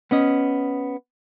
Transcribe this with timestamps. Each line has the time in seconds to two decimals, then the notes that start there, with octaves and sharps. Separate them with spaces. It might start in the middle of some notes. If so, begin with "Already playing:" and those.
0.11 B3 C#4 D#5